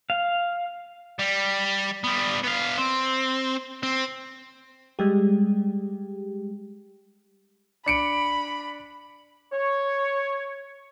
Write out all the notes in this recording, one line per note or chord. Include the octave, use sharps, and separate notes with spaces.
F5
G3
G3 B3
B3 F5
C4
C4
G3 G#3 G4
D4 B5 C#7 D7
C#5